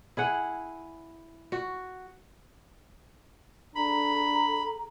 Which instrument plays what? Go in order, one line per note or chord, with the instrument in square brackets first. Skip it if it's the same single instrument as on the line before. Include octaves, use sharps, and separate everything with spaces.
[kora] E4 G#4 F#5
F#4
[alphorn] D4 [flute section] G#4 A4 A#5 [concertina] B5